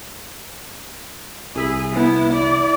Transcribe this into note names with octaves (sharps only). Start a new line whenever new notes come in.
C2 G#4 E5 B5
B3 E4
E4 D5